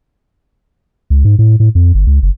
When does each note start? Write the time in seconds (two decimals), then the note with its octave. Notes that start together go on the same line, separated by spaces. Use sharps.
1.10 C#2
1.25 G#2
1.39 A2
1.60 A2
1.75 F2
1.94 G1
2.07 C#2
2.23 F#1